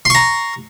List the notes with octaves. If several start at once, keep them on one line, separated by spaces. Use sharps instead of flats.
A#5 C6 C#6